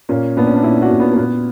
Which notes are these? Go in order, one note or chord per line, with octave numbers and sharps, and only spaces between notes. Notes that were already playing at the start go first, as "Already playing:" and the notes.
A#2 A#3 C#4
A#2 B3 D4
C#4
D4
A#2 C#4 E4
D4 F#4
A#2
B3
A#3
A#2 B3